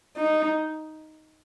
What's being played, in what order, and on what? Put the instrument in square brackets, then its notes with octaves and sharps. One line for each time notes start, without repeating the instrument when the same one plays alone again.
[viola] D#4